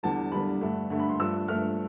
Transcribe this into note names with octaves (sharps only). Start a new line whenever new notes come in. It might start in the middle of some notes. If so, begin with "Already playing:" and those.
E2 D3 G3 A5
E2 D3 G3 B5
G2 D3 A3
G2 D3 A3
B5
C6
G2 F3 A3 E6
G2 F3 A3 F6